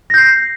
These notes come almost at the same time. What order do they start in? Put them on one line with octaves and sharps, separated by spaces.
A#6 G6 C7